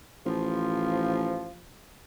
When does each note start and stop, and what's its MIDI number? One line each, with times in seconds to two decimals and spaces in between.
0.26 1.54 33
0.26 1.54 53